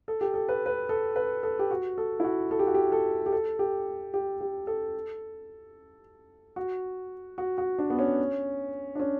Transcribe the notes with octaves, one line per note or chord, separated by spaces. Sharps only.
A4
G4
A4
B4
B4
A4
B4
A4
G4
F#4
A4
E4
F#4
A4
G4
F#4
G4
A4
G4
A4
G4
G4
G4
A4
F#4
F#4
F#4
D4
B3
C#4
D4
C#4